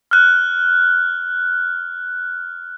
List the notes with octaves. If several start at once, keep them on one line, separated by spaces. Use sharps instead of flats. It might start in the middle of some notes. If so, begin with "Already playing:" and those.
F6 F#6